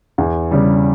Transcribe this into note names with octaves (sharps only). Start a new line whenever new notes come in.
E2
C#3 G3